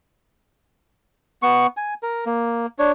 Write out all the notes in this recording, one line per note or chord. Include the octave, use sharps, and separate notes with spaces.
B3 C#6
G#5
A#4
A#3
D4 C#5